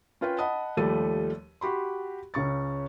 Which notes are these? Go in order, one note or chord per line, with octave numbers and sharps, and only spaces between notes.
C#4 F4 B4 C#5 G5
D#5 F#5 A5 B5 D#6
D#2 F3 G3 A3 A4 D#7
F#4 G4 B5 C6
C#2 C#3 C#6 A6